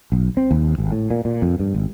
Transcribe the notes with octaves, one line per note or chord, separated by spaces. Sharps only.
B1
C4
D#2
G#1
A2
A#2
A#2
F2
G2
G#1